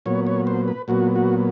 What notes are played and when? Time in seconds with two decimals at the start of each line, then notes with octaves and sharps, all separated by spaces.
0.06 A#2 F#3 B3 C#5
0.27 C#5
0.47 C5
0.68 B4
0.88 A#2 F#3 B3 F#4
1.16 F#4